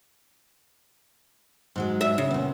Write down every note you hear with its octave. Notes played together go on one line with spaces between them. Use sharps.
G#2 F#3 G#3
E5
C#3
A#2 B3